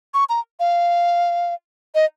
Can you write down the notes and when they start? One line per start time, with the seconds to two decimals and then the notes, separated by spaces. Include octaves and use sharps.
0.14 C#6
0.29 A#5
0.60 F5
1.95 D#5